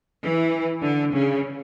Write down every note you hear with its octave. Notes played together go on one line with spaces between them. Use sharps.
E3
D3
C#3